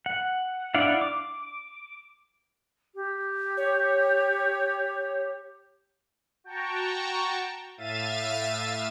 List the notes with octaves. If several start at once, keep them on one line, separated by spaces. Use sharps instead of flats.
F#5
D4 E4 D5 F5 F#5
D6
G4
C#5
F#4 G5 A5 A#5 C#6
A2 E5 F5 A6 D#7